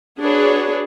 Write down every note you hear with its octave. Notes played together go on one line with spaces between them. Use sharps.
D4 F#4 G#4 B4 C#5